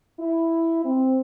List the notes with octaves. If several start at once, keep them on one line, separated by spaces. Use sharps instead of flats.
E4
C4